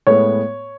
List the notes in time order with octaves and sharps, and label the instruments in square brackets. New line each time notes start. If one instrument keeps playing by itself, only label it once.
[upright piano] A2 G#3 B3 C#5